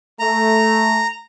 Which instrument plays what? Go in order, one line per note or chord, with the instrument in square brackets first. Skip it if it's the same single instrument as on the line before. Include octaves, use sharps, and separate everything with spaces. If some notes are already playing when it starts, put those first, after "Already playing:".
[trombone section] A3 [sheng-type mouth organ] A#5